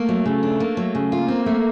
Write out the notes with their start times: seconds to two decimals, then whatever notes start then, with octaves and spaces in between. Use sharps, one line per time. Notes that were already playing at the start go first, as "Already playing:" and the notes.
Already playing: A3 A#3
0.09 F#3
0.26 C#3
0.43 D4
0.60 A#3
0.77 F#3
0.95 C#3
1.12 A#3 F4
1.28 C4
1.46 A3